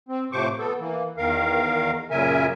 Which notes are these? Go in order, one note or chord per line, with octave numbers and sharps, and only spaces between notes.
C4
A2 C3 F3 C5 C#6 D6
B3 A4
E3 A#3
E2 D#3 A#4 F5
F#2 A#2 C#3 A#4 E5 G#5